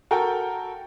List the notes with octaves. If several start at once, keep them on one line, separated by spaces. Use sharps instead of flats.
F#4 A4 A#4 G5